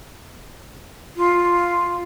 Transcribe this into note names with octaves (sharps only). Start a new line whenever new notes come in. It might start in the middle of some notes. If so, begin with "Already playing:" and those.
F4